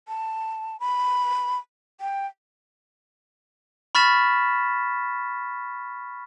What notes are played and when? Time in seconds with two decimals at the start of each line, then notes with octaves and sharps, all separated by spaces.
0.08 A5
0.80 B5
2.01 G5
3.95 B5 C#6 F6 A6 B6 E7